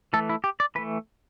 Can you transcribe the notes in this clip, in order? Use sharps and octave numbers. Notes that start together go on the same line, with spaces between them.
E3 A3 A4
E4
G4
D5
E3 A3 B4